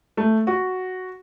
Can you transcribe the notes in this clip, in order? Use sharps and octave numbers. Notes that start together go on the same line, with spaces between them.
A3
F#4